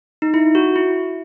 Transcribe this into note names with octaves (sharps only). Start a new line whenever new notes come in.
D#4
E4
F#4
E4